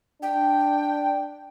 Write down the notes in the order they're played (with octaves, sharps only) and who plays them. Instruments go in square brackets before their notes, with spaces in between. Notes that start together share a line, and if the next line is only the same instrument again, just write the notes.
[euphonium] D4 [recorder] G5